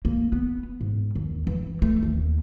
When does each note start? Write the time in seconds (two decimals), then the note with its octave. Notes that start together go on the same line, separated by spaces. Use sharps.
0.05 A#3
0.32 B3
0.81 G#2
1.15 D#2
1.47 E3
1.82 A3
2.03 D#2